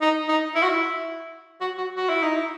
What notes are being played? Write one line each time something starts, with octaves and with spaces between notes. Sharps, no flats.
D#4
D#4
E4
F#4
E4
F#4
F#4
F#4
E4
D#4
E4